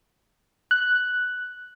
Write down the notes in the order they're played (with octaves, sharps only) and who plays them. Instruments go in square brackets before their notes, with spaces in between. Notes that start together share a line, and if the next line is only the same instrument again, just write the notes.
[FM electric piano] F#6